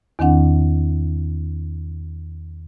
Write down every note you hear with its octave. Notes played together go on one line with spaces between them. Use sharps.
E2 D#3 C4 D4 F#5